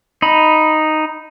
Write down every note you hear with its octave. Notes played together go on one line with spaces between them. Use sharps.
D#4 B5